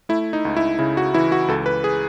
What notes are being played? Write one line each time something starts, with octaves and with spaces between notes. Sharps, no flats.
A3 E4
D#4
C#2
E4
C#3 E4
F#4
E3 E4
F#4
C#2 A4
B4
G#4